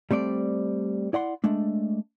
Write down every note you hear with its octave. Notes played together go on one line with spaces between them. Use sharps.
G3 A3 C4 D5
E4 D5 F#5 C6
G#3 A3 D4